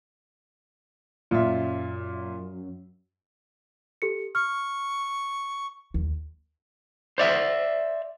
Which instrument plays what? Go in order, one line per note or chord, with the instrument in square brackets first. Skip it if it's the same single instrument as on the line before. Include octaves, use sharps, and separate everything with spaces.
[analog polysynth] F#2 [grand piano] A#2 F4 E5
[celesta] G4 A4 C#7
[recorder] C#6 [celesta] F6
[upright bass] D#2
[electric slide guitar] C5 D5 E5